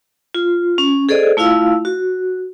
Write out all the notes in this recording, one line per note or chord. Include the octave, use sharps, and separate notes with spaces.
F4
C#4
G#4 A4 C5 D5 D#5
A3 E4 F4 F5 E6
F#4